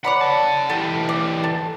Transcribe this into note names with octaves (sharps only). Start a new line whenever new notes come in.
C#5 D5 F#5 B5
F#5 A5
E3 G4 A4
D5
A4